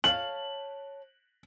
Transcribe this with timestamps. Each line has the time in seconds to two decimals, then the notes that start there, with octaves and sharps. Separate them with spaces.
0.04 C#5 F5 A5 F#7